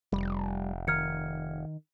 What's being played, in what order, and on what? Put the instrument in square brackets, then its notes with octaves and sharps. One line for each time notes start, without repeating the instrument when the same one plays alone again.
[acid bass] F1 [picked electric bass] G3
[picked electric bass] D#3 [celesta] F6 G#6 C#7